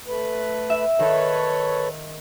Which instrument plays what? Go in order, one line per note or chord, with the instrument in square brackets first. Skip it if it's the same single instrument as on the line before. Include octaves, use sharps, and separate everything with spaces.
[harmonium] A3 B4
[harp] E5
[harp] D#3 [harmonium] A4 B4 C#5